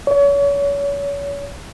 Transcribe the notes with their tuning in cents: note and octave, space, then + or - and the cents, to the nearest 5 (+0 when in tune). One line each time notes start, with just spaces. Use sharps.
C#5 +35